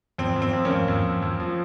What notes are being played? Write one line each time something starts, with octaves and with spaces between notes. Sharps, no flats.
F2 C4
F2
C4
F2
A#3 C#4
F2
F2
F2
F2
F3